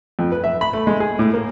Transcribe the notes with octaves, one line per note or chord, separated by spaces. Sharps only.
F2
B4
E5
B5
A3
G#3
G#4
A2
A#3